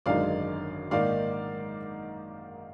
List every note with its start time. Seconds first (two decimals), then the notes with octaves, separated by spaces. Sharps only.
0.06 G#1 F#2 D3 G#3 D#4 D5 F5
0.91 G#2 D#3 A#3 D#4 D5 F5